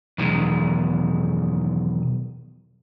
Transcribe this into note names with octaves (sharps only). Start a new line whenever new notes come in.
B1 E2 D#3 G#3